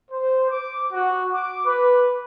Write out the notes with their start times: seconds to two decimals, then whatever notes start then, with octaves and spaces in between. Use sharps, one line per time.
0.10 C5
0.49 D6
0.93 F#4
1.32 D6
1.66 B4